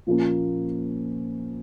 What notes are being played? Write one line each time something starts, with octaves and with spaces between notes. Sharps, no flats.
A#2 F3 A#3 C#4